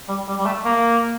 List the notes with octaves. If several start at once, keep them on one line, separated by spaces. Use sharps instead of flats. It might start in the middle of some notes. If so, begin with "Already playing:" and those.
G3
G3
G3
A3
A#3